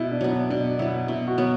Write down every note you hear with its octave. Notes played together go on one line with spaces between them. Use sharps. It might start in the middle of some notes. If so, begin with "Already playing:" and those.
Already playing: B2 E4
D4
F#3 B3
D4
B2 D4
F#3 B3 E4
B2 E4
F#4
F#3 B3